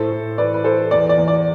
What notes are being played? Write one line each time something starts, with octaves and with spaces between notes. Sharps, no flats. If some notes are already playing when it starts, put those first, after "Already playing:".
Already playing: A2 A4 C5
A2
E3 B4 D5
B4
E3 A4 C5
E2 D5
D5
E2
D5